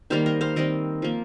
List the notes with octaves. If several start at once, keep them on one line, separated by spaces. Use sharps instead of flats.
D#3 G3 A#3 C5 F5
A#4 D#5
C5 F5
D#3 G3 C4 A#4 D#5
F3 A#3